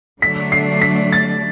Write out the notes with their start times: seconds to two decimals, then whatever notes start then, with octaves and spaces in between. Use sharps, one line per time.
0.21 D3 F#3 A3 D4 B6
0.52 C7
0.82 B6
1.12 A6